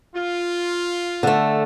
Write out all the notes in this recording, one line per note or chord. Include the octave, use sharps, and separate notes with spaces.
F4
D3 A3